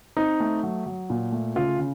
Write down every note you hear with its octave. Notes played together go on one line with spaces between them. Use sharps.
C4 D#4
A3
F#3
F#3
A#2
A3
C#3 F4
C#3